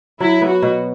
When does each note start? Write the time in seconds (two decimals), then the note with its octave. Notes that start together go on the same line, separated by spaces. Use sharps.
0.20 F#3 E4
0.41 B3
0.48 F#4
0.62 B2